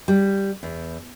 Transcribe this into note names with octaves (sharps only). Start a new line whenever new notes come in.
G3
E2